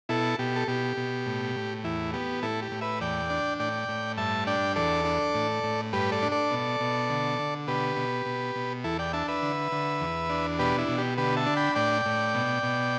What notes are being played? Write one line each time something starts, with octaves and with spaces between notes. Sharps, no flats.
B2 E4 A4
B2 G4
A4
B2 G4
B2
A2
A2
E2 E4
B3 G4
A2 E4 A4
G4
A2
B4 E5
E2 D5 G5
D4
A2 D5 G5
A2
G2 E5 A5
D4 D5 G5
E2 A4 D5
D4
A2
A2
G2 G4 B4
A4 D5
D4
A4 D5
B2
B2
D3
D3
B2 G4 B4
B2
B2
B2
E2 E4 A4
D5 G5
D4 E5 A5
B4 E5
D3
D3
E2
D4
B2 G4 B4
E4
B2
G4
D3 G4 B4
E5 A5
D4
G5 B5
A2 D5 G5
A2
B2
B2